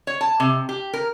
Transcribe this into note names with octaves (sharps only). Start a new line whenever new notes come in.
C#5
A5
C3
G4
A#4